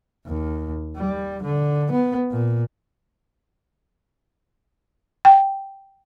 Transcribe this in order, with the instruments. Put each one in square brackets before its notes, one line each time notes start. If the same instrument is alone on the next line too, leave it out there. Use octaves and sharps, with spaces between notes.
[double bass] D#2
G3
D3
B3
A#2
[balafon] G5